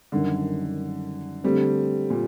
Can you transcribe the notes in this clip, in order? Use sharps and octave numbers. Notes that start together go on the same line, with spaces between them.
F#2 D3 D#3 G3
D3 G3 A3 C4
A#2